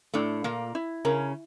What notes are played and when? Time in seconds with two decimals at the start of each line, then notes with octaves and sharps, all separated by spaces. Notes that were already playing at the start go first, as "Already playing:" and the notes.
0.14 A2 A3 D4
0.44 A#2 A#3 F4
0.75 E4
1.05 C#3 C#4 A#4